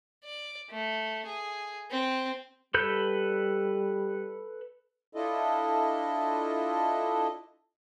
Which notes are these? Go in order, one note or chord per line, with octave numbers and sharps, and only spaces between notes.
D5
A3
G#4
C4
G3 A4 B4 G6
D4 E4 F4 A4 D#5